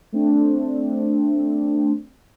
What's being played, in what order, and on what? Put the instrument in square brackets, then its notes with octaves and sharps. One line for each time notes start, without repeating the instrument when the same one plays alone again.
[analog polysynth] A3 C4 D4